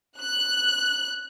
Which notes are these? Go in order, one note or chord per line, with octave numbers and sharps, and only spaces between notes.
F#6